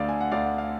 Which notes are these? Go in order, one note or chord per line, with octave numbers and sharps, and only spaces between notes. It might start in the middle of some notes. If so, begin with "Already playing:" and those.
Already playing: D2 D3 D5 F5
G#5
F#5
D2 D5 F5
F#5
F5